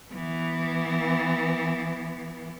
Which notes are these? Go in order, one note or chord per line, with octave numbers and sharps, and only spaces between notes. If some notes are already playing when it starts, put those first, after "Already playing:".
E3 B3